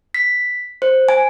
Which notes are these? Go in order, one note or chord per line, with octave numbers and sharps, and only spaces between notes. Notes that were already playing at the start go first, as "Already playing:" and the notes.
B6
C5
G#5